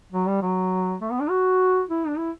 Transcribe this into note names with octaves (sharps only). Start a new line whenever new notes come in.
F#3
G3
F#3
A3
B3
D4
F#4
E4
D4
E4